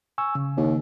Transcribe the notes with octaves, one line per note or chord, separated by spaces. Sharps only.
G#5 C#6 E6
C#3
D#2